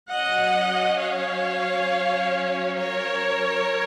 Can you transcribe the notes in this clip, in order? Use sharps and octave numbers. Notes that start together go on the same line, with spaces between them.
F#3 C#4 D#5 F#5
C#5 F5
A#4 C#5